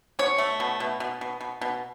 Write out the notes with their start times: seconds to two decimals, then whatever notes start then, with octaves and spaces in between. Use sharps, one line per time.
0.19 B2 C#5
0.38 A3
0.60 B2
0.80 B2
1.00 B2
1.21 B2
1.40 B2
1.61 B2